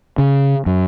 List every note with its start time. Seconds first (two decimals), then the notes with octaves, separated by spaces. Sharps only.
0.18 C#3
0.66 F#2